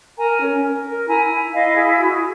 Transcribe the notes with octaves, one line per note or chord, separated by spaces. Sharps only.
A#4 G#5 A#5
C#4
A#4
A#4
E4 G#5 A#5
E4
E4 D#5 F5
G#4
F#4